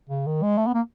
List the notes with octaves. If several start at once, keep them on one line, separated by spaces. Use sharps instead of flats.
C#3
D#3
G#3
A3
B3
A#3